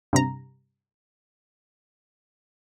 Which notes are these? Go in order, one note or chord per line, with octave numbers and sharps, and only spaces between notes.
G2 C3 A#5